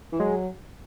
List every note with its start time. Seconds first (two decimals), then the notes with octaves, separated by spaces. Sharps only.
0.12 E3
0.20 F#3 G#3